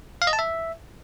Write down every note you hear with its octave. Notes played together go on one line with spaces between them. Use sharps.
F5
D#5
A5
E5